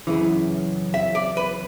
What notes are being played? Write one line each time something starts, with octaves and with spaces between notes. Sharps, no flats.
F#2 C#3 E3
E5
D5
B4